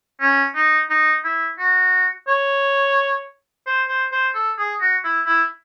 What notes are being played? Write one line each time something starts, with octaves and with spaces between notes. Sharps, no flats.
C#4
D#4
D#4
E4
F#4
C#5
C5
C5
C5
A4
G#4
F#4
E4
E4